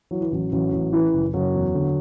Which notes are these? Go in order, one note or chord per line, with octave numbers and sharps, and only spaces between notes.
E3 F#3
E3
A1 F#3
A1 F#3
A1
E3
F#1
F#1 F#3
E2
D3